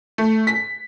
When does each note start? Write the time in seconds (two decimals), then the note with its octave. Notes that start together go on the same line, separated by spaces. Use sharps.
0.18 A3
0.47 B6